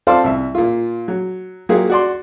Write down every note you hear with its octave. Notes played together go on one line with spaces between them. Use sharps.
C4 F4 A4 C5 D5 F5
C2 E5
A#2 F4
F#3
F#3 A#3 F4 G4 G#4
F#4 D5 C6